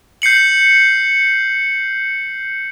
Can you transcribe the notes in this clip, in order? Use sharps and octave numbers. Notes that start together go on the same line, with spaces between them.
G6 C7 C#7 F#7